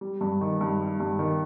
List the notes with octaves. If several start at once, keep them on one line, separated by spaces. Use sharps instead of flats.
G3
G2
D#3
G2
G3
G2
D#3